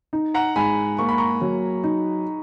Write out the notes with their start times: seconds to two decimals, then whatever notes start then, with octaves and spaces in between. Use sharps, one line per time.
0.13 D#4
0.34 F#5 A#5
0.56 G#2 G#5 B5
0.98 A#3 C#6
1.09 B5
1.18 A#5 C#6
1.41 F#3
1.84 D#4